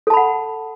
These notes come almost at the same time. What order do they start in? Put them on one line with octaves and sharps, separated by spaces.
A4 A5 B5 F#5